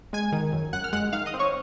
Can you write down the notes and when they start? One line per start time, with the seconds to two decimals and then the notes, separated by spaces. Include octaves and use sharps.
0.13 G#3 G#5 G#6
0.32 D#3
0.53 F#2
0.73 F#2 F#5 F#6
0.84 F6
0.93 G#3 F#5 F#6
1.13 D#3 F5 F6
1.26 D#5 D#6
1.34 C4
1.39 C#5 C#6